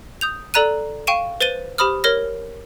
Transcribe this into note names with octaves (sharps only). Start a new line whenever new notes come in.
D#6 G6 F7
A4 D5 A#5 F#6 D#7
F5 G5 C#6 D#7 E7
B4 C5 A6 D#7 G7
G4 C5 B5 D#6 F6
A#4 C#5 F6 A#6